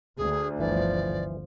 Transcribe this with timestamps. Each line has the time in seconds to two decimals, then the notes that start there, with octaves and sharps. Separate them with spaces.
0.18 D2 G#4
0.60 G1 E3 F3 D5